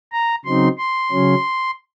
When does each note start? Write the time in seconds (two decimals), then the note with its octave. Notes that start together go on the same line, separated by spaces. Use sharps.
0.12 A#5
0.45 C#3 F#3 C4 D#4 C6
0.78 C6
1.12 C#3 F#3 C#4